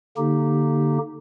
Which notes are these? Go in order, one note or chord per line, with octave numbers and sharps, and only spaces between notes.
D3 A#3 D#4 G4